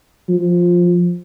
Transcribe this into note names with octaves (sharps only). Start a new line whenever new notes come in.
F3